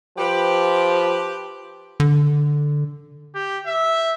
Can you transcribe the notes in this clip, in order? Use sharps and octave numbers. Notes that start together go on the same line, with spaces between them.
F3 G4 B4
D3
G4
E5